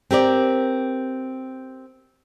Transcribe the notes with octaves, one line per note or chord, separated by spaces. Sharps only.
C4 G4 A#4 D5